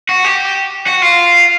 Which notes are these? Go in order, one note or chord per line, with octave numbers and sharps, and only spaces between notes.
F#4
G4
F#4
F4